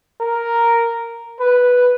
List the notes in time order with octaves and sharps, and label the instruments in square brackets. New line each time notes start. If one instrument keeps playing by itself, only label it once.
[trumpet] A#4
B4